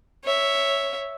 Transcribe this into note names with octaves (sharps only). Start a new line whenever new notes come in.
C#5 E5